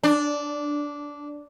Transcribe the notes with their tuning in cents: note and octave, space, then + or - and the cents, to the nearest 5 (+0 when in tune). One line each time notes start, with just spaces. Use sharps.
D4 -10